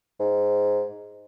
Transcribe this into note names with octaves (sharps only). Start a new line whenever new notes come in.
G#2